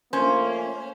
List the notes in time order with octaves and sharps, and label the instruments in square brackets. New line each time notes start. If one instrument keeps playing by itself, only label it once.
[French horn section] F3 A3 A#3 [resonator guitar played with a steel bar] C#4 [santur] C5